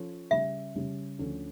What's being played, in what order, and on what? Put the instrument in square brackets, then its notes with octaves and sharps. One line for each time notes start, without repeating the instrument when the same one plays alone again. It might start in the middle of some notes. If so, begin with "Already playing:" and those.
Already playing: [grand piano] F3 C#4 F4 A4 C#5
[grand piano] C#3 G3 C#4 [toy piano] E5
[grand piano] C#3 G3 C#4
D2 D3 F3 C#4